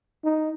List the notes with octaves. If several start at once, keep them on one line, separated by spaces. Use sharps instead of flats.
D#4